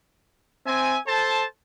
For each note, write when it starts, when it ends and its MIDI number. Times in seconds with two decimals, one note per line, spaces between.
0.67 0.98 60
0.67 0.98 76
0.67 0.98 80
1.07 1.45 69
1.07 1.45 72
1.07 1.45 81